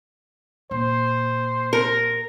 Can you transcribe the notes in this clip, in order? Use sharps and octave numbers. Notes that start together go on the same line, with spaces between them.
A#2 C5
A#4